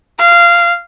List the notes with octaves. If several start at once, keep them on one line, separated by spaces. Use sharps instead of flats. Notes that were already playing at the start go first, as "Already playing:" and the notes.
F5